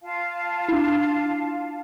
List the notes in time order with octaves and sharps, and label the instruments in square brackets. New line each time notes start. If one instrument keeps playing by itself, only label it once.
[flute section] F4 F5 A5
[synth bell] D4 E4